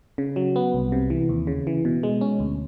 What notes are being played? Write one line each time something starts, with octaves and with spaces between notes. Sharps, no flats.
C#3
F#3
B3
C2
C3
E3
D#2
C#3
E3
B2
G#3
C#4
D2